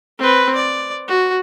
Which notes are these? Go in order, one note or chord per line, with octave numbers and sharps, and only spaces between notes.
C4 B4
D5
F#4